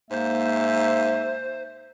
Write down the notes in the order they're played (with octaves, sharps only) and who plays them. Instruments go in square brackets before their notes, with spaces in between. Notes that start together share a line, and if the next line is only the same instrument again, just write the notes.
[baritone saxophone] G#2 [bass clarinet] A#3 [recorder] C5 [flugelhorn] E5